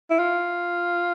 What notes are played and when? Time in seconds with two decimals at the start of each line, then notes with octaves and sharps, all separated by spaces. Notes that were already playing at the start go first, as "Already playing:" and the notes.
0.10 E4
0.19 F4